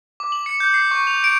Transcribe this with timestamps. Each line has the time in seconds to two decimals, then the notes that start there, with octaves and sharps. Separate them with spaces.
0.20 D6
0.32 F#7
0.46 C#7
0.60 G6
0.74 C7
0.91 C#6
1.07 F7
1.24 D7